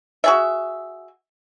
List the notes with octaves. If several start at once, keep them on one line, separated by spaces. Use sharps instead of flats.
F#4 G#4 E5